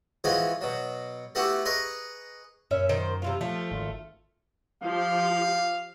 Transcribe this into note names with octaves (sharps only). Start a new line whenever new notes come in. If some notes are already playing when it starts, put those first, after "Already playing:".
E3 F3 G#3 F#4 G#4
B2 F#3
A3 B3 E4 F#4 G4
G#4 B4 D#5 A#5 C#6
F#2 C#4 E5
D#3 C5
C3 E3 F4
F3 A3 F4
G#1
F3 G4 F5